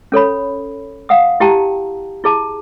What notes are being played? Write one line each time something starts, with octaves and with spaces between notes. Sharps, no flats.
C#4 A4 C#5 B5
F5 F#5 D#6
E4 G4 G5 A5 A#5
E4 G#4 A5